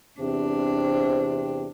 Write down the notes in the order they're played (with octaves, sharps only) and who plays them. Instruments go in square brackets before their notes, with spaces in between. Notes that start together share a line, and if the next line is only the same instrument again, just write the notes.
[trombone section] E2 C3 C4 [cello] D4